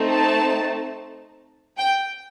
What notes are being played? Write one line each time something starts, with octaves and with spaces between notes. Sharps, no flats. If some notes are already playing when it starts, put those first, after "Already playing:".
Already playing: A3 C4 D#4
A5
G5